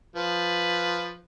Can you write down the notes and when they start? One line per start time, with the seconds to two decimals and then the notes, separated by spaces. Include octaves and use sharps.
0.16 F3 B4